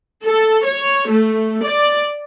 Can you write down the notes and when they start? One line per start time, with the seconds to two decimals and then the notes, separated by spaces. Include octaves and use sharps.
0.24 A4
0.64 C#5
1.08 A3
1.63 D5